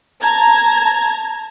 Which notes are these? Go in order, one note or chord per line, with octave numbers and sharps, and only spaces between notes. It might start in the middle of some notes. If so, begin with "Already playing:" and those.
A5 A#5 G#6